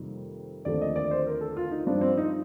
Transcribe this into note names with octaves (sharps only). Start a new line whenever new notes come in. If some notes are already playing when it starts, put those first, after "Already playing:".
Already playing: F2 C3 D#3 G3 A#3
D#2 D3 F3 A3 C4 D5
D#5
D5
C5
A#4
A4
F4
D#4
G2 F3 C4 D4
C4
D#4